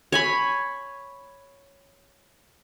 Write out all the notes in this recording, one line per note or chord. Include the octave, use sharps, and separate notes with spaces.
C#5 G#5 B5